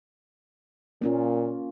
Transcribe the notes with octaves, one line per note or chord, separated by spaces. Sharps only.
A#2 A#3 C#4 F4